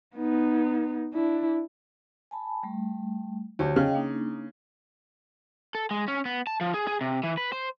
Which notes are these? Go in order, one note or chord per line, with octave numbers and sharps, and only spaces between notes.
B3 D#4
D4 E4
G#5 A5 B5
G3 A3
D2 G4 C#5
C#3 D#5 F5 G5
A#3 D4 D#4
A4
G#3
C#4
B3
A5
F3
G#4
G#4
C3
E3
B4
C5